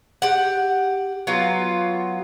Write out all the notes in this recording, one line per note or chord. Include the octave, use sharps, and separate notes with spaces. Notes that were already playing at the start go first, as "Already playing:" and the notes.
G4 F#5
F#3 B3 F4